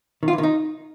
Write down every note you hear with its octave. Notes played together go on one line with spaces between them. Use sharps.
D#3
F4
E3
D#3
D#4